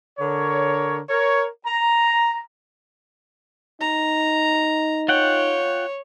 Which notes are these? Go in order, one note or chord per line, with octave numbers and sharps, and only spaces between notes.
D3 A#4 C#5
A#4 C#5
A#5
D#4 A#5
F4 C#5 F#5 G5